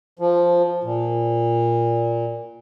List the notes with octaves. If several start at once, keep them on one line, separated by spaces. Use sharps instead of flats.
F3
A#2